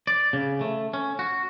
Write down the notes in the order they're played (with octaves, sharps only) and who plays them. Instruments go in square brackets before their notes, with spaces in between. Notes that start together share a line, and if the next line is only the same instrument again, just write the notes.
[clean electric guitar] D5
C#3
A3
C#4
F#4